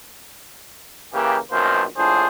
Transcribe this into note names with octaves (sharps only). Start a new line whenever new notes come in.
C#3 E3 A#3 G4
A#1 F#2 B2 D#3 A#3 C5
A#1 A2 F3 D4 G#4 C5